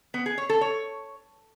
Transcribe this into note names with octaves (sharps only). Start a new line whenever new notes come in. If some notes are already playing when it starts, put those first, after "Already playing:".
B3
G#4
C#5
A4
C#5